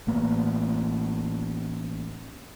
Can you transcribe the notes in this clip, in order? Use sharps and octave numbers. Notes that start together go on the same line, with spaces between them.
A1 A2 A#3 B3